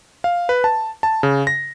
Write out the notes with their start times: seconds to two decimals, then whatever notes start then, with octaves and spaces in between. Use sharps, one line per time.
0.24 F5
0.49 B4
0.64 A5
1.03 A5
1.23 C#3
1.47 A#6